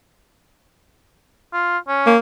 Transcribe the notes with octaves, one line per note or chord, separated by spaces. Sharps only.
F4
C#4
A#3